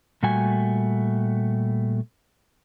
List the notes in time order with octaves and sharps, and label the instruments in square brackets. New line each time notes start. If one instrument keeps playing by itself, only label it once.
[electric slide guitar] A#2 G3 A3 F#4 G#5